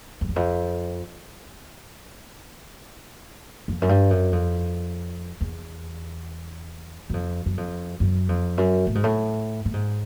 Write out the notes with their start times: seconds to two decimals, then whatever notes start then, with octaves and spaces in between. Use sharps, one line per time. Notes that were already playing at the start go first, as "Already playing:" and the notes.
0.21 F2
0.29 E2
0.36 F2
3.68 F2
3.82 F#2
3.89 G2
4.10 F#2
4.32 F2
5.41 E2
7.10 F#2
7.14 F2
7.46 F#2
7.57 F2
8.00 F#2
8.29 F2
8.57 F#2
8.87 A2
8.95 G#2
9.04 A2
9.65 A2
9.73 G#2